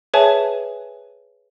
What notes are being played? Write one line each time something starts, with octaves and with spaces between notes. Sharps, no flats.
G#4 B4 C#5 E5 G#5 A5